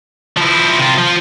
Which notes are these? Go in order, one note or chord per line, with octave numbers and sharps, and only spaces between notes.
F3 E4
C3 F4
F3